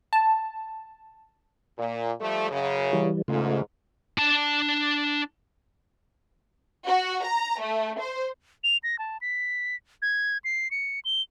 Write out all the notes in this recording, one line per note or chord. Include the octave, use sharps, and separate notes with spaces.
A5
A#2
F3 G3 A3
F#2 C#3
E3 G3
E2 G#2 C#3 A3 F4
D4 A5
F#4
A#5
A3
C5
F7
A#6
A5
B6
G#6
C7
C#7
G7